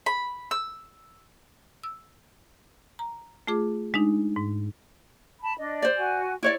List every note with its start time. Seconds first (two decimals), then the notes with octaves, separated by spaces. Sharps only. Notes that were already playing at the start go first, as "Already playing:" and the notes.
0.06 B5
0.51 E6
1.83 E6
2.99 A#5
3.47 A3 F4 G#4 D6
3.94 G#3 D4 D#4
4.36 G#2
5.41 A5 B5
5.59 D4 D#5
5.82 C5 D5
5.96 F#4 G#5
6.43 E4 C#5 D5